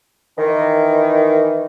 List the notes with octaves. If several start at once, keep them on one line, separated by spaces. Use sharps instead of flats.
D#3 E3